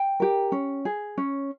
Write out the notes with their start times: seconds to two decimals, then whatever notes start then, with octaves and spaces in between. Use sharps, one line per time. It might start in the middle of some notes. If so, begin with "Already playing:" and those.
Already playing: G5
0.20 G4 A#4
0.52 C#4
0.85 G#4
1.18 C#4